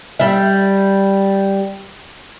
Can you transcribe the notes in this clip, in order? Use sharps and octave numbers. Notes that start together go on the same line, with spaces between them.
G3 E5